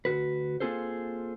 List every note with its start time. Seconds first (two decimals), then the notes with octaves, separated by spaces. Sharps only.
0.05 D2 G#2 F#4 B4
0.60 A#3 C4 F4 G#4 A4 C5